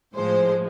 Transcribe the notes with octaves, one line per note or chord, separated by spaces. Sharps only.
A2 F3 G#3 C5